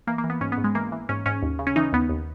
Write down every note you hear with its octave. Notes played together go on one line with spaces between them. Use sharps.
E3 A#3
A#3
E3
B3
G#2 C#4
B3
G#2
G#3
E3 A#3
E3
G#2 C#4
G#2 C#4
D#2
C#3
C#4
E3 D#4
D#2 B3
D#2